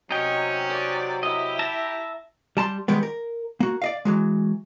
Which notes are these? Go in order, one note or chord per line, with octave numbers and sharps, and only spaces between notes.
C3 F#3 C#4 D#4 D#5 G5
D5
E4 G4 D#5
E5 A5 A#5
G3 A5 A#5 C6
D#3 G3 G#3 B3
A#4
A#3 F#4
D5 D#5 F5
E3 F#3 G#3